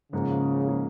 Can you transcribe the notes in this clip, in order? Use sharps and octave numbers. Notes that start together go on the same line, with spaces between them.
G#2 C#3 F3 A#3 D#4 G#4
F3 A#3 D#4 G#4